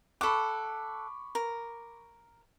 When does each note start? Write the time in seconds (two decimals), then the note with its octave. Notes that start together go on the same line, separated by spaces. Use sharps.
0.21 A4 F#5 B5 C#6 D6
1.35 A#4